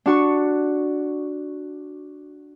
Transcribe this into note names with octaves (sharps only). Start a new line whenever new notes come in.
D4 F#4 C#6